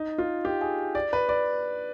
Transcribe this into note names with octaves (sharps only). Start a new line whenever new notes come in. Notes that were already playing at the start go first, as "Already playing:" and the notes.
Already playing: D#4
F4
G4
G#4
D5
B4
D5